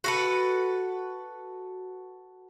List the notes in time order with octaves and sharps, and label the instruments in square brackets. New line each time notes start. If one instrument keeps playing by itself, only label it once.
[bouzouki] F#4 A4 B4